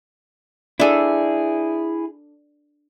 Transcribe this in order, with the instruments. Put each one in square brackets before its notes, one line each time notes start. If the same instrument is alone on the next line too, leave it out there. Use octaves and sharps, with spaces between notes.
[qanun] D4 A4 [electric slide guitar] E4 G#4